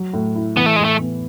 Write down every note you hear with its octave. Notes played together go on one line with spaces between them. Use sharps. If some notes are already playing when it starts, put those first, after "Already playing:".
Already playing: F#3
A2
E4
E3 B3
A3
A2 G#3
A3
B3